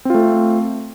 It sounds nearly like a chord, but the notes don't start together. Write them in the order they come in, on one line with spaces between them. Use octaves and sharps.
C4 F4 A3